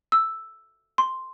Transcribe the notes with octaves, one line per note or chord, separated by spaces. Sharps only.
E6
C6